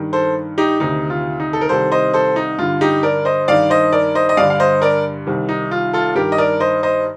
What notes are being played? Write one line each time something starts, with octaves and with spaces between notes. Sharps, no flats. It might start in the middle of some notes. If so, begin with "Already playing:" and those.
Already playing: G2 D#3
A4 C5
D#4 G4
D2 C3 D#3 D#4
F4
D#4
A4
A#4
C2 C3 D#3 A4 C5
C5 D#5
A4 C5
D#4
G2 D3 F4
D#4 G4
A#4 D5
C5 D#5
G2 D#3 D5 F5
C5 D#5
A#4 D5
C5 D#5
D#5
G2 D3 D5 F5
F5
C5 D#5
A#4 D5
C2 C3 D#3
D#4
F4
F4 A4
G2 D#3 G4 A#4
D#5
A#4 D5
C5 D#5
C5 D#5